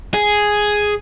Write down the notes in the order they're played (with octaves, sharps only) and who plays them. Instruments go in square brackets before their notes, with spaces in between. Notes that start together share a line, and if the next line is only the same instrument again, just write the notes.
[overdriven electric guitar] G#4